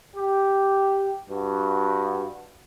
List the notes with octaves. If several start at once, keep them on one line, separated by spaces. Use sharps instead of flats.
G4
G2 F#4